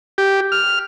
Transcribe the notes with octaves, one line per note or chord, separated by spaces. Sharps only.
G4
F6